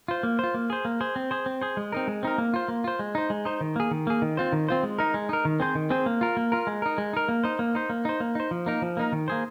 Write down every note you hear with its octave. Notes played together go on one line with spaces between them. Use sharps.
F4 C5
A#3
F4 C5
A#3
G#4 C5
A#3
G#4 C5
C4
G#4 C5
C4
G#4 C5
G#3
C4 D#4 A#4
G#3
C4 D#4 A#4
A#3
F4 C5
A#3
F4 C5
G#3
D#4 C5
G#3
D#4 C5
D#3
A#3 G#4
D#3
A#3 G#4
D#3
C4 F4 C5
D#3
C4 F4 C5
G#3
D#4 A#4
G#3
D#4 A#4
D#3
C4 G#4 C5
D#3
C4 G#4 C5
A#3
F4 A#4
A#3
F4 A#4
G#3
D#4 A#4
G#3
D#4 A#4
A#3
D#4 C5
A#3
D#4 C5
A#3
D#4 C5
A#3
D#4 C5
F3
A#3 D#4 A#4
F3
A#3 D#4 A#4
D#3
A#3 G#4 C5